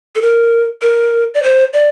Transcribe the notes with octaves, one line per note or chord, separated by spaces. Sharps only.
A4
A#4
A#4
D5
C5
D5